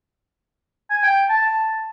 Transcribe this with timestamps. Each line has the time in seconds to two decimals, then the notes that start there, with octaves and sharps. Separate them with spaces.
0.90 G#5
1.03 G5
1.29 A5